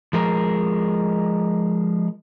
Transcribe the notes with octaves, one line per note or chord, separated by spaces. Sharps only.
F3 G#3 A#4